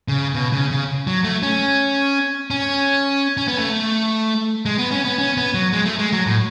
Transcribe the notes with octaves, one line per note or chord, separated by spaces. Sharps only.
C#3
B2
C#3
C#3
F#3
A3
C#4
C#4
C#4
B3
A3
G#3
B3
C#4
B3
C#4
B3
F#3
G#3
A3
G#3
F#3
A2